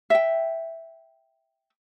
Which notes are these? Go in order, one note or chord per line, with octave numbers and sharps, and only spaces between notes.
E5 G5